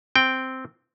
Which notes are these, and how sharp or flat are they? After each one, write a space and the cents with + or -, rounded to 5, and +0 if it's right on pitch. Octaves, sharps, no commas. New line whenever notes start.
C4 -5 G5 +0